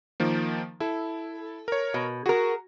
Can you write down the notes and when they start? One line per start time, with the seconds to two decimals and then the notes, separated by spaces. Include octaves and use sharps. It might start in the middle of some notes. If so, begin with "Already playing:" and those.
0.20 D#3 F3 A#3
0.80 E4 A4
1.68 A#4 C#5
1.94 B2
2.26 F#4 G#4 A#4